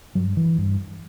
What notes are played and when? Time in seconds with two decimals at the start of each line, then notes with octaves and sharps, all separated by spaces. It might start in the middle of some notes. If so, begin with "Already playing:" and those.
0.15 G2 F#3
0.37 E3
0.58 G2